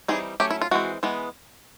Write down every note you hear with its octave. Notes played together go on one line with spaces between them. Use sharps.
E3 G3 C4 D#4 G#4
F#3 A3 C#4 G4
E4
F4
E3 G#3 C4 F#4
E3 G#3 B3